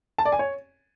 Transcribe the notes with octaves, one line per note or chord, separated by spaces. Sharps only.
A5
D5
G#5
C#5